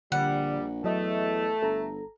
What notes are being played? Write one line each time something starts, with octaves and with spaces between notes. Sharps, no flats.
A#1 D3 G3 F#5
E2 F#3 A3 D#5
G1 A4 A#5